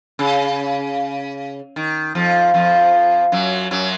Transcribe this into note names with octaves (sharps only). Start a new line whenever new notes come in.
C#3
D#3
F2 F3
F2 F3
F#2 F#3
F#2 F#3